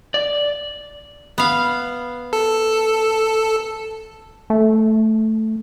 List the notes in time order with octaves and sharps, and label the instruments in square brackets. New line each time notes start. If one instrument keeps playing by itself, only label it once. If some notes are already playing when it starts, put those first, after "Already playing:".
[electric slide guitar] D5
[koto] B3 F5
[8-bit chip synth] A4
[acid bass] A3